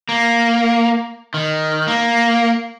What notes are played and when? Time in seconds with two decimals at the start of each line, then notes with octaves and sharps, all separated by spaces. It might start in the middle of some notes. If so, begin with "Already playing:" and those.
0.09 A#3
1.34 D#3
1.88 A#3